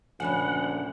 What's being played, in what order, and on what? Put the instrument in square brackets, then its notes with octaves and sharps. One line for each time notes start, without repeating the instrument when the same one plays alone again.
[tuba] D2 [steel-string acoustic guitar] A#2 C#3 F3 [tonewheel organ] F#5 [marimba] G#5 B5